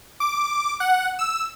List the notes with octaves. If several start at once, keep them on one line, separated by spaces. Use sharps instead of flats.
D6
F#5
E6